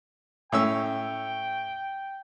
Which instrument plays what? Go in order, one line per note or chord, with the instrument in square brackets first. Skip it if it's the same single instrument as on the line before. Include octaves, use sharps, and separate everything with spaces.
[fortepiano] A2 C#4 E6 [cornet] G5